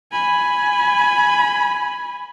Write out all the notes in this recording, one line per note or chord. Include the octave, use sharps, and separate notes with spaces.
G#5 B5